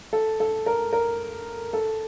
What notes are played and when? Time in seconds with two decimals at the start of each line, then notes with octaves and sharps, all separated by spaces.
0.13 A4
0.40 A4
0.66 A#4
0.93 A#4
1.73 A4